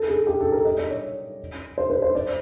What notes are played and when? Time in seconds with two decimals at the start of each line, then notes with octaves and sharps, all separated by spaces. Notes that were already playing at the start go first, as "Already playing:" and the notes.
Already playing: A4
0.08 G#4
0.27 G4
0.41 A4
0.52 A#4
0.64 D#5
0.78 D5
0.90 C#5
1.78 C5
1.90 B4
2.02 C5
2.15 D5